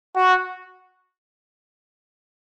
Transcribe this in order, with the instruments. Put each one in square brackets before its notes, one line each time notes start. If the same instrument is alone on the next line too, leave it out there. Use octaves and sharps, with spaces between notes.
[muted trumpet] F#4